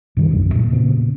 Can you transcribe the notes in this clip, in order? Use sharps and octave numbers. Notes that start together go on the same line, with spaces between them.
F#2 C3 D#3 G3
E1 B1 F#2 D4
F2 A#2
A#2 C#3 B3 C4